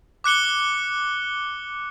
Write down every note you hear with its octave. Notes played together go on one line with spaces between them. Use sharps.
D6 F#6 C#7 G7